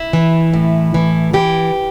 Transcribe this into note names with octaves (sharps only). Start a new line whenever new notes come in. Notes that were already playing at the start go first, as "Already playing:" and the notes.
Already playing: E4
E3
A2
E3
E3 G4